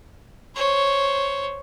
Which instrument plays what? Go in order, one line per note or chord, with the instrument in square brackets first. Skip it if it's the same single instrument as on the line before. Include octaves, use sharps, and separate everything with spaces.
[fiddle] C5 C#5